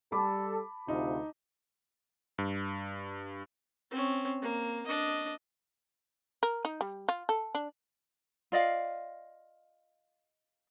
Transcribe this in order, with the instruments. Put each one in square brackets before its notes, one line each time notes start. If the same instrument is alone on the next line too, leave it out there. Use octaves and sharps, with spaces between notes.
[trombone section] G3 A4 [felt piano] A5 B5 D6
[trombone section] D2 C3 F4 [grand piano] D#4
[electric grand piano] G2
[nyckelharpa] C4 C#4
A#3
D4 D#5
[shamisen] A#4
D#4
G3
F4
A4
D4
[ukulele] F4 D5 D#5 F5